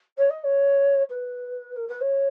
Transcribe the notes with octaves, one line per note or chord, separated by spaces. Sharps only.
C#5
D#5
C#5
B4
A#4
B4
C#5